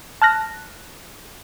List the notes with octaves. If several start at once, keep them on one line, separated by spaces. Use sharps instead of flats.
A5 F6 F#6 A#6